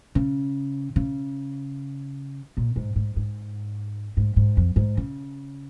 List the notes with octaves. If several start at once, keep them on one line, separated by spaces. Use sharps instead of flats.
C#3
C#3
A#2
G#2
G#2
G#2
G#2
G#2
F2
G#2
C#3